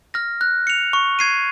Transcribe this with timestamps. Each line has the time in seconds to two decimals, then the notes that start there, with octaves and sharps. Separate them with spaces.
0.14 F6 A#6
0.41 F#6
0.67 C#7 F7
0.93 C#6
1.19 G#6 C7 D#7